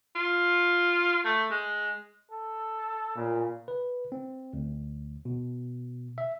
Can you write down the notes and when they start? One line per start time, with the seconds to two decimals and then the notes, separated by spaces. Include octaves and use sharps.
0.15 F4
1.25 A3
1.51 G#3
2.31 A4
3.16 A#2 C#3
3.68 B4
4.12 C4
4.53 D2
5.25 B2
6.18 E5